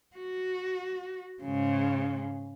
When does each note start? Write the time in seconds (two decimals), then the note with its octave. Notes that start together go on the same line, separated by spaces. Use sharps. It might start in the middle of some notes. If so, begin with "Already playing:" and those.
0.16 F#4
1.43 G#2 C#3